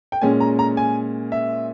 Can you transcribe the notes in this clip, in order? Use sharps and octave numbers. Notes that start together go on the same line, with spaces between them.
G5
A#2 G#3 C#4 G#5
A#5
A#5
G#5
E5